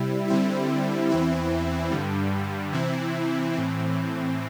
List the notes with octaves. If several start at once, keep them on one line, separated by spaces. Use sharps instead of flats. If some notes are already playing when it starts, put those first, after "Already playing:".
Already playing: C3 G3 E4
D3 G3 C4 E4
E2 E3 C4 E4
G2 D3 G3
C3 E3 C4 E4
A2 E3 C4